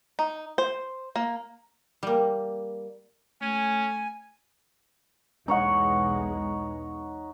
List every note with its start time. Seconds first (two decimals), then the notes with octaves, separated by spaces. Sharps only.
0.19 D#4
0.58 C5
1.16 A#3
2.03 G3 A#3
3.42 A3 C#4 G#5
5.48 B1 E2 G#3 D#4 C#5 F#5